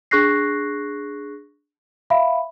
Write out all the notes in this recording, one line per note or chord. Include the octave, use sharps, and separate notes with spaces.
D4 G#4 C#6 F#6 A#6 C7
E5 F5 B5